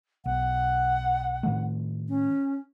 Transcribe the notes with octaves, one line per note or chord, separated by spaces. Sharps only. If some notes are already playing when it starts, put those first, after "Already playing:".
B1 F#5
A2 D#3 A3
C#4